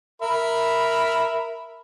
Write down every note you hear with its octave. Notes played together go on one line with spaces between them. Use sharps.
A#4 E5 B5